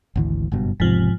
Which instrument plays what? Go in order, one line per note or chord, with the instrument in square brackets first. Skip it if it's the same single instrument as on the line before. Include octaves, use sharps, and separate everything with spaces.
[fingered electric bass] G#1 D2 E3
F#1 G2 B2
[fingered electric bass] E1 C3 [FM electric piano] G#2 F3